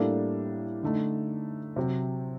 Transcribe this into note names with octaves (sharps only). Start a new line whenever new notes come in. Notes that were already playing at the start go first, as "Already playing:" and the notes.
Already playing: A2 G3 A#3 D4 A4
D3 A3 D#4
C3 F#3 C4